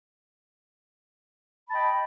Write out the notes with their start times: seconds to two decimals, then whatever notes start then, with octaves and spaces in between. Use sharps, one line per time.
1.67 B5
1.69 A5
1.72 G5
1.74 D#5